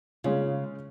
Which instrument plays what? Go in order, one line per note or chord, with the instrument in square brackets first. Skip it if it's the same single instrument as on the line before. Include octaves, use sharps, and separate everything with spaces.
[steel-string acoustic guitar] C#3 [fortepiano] G#3 C#4 F4